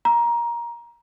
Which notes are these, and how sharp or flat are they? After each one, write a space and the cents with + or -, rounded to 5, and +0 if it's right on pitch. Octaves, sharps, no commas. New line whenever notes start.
A#5 +15